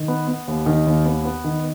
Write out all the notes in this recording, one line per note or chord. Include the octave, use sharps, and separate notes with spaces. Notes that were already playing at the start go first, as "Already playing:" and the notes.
Already playing: D#3
B3
B3
D#2
D#3
D#2
B3
B3
D#3